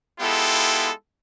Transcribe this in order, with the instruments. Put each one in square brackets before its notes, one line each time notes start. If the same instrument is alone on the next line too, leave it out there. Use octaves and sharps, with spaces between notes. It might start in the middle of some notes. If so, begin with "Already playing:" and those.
[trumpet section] G#3 B3 E4 F4 G4 A4